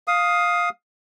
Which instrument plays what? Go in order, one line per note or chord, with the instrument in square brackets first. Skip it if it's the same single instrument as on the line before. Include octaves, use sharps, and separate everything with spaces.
[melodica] F5 D#6